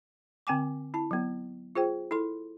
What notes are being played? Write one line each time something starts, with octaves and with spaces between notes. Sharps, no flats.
D3 C4 G5 G#5 D6
E4 A5
F#3 B3
F4 G#4 C5 G5
E4 A4 C6